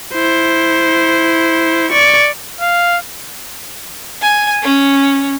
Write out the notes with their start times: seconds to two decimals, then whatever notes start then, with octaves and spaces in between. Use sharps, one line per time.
0.13 E4 C5
1.92 D5 C#6
2.61 F5
4.22 G#5
4.62 C#4